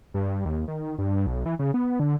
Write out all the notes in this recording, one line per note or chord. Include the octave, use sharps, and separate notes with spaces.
G2
D#2
D#3
G2
B1
E3
C#3
B3
D3